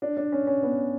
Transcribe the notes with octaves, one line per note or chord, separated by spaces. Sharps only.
D4
D4
C#4
C#4
B3